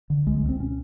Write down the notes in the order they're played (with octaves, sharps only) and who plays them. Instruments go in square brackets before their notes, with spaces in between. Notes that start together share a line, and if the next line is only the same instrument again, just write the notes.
[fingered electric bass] D3
C#2 G#3
C#2 G#3
C4
B2 C#4